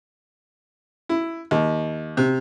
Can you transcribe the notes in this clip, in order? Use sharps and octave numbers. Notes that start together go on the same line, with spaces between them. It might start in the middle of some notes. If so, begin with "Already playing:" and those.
E4
D#2
C3